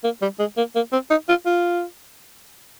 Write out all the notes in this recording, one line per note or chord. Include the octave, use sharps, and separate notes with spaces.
A#3
G3
G#3
A#3
A#3
C4
D#4
F4
F4